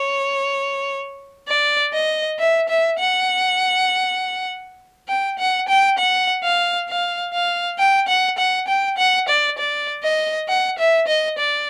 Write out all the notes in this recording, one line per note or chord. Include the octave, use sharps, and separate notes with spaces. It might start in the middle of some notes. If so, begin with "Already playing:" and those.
Already playing: C#5
D5
D#5
E5
E5
F#5
G5
F#5
G5
F#5
F5
F5
F5
G5
F#5
F#5
G5
F#5
D5
D5
D#5
F#5
E5
D#5
D5